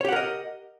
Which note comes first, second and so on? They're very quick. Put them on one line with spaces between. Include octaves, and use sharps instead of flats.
C#5 G4 F#5 A#4 D#5